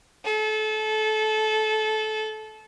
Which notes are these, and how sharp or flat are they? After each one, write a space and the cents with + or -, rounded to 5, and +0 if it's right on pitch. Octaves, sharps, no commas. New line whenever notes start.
A4 -25